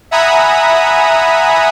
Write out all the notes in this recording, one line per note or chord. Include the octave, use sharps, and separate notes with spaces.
E5 F#5 G#5 A#5 B5 D#6